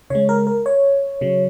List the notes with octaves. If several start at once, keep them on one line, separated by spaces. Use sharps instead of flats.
C#3 G#3 C#5
A#4
A#4
C#5
C#3 F#3